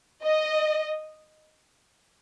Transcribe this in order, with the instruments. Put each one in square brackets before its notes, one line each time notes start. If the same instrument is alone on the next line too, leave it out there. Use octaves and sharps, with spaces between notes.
[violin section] D#5